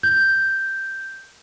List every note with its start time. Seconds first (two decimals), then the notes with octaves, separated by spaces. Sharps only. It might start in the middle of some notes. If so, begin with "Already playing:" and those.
0.03 G6